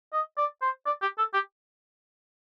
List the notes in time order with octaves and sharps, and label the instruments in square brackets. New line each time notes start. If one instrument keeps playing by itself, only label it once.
[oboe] D#5
D5
C5
D5
G4
A4
G4